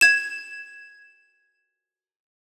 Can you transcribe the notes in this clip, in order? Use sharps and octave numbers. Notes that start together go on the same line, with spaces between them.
G#6 E7